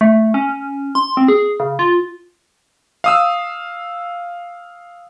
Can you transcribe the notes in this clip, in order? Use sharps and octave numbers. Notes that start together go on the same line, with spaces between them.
A3
C#4
C6
C4
G#4
C#3
F4
F5 D#6 E6